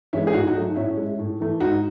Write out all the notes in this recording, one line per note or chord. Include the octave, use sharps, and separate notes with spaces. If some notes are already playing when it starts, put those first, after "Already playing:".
E3 G#3 C#4 E4
G#4
A2 D#4 F#4
D#4 F#4
F#3 A3
D#4
A2 C#4 E4
G#3
A2
E3 A3
G#2 D#4 F#4